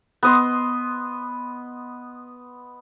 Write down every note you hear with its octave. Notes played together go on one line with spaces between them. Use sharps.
B3 D#5 C6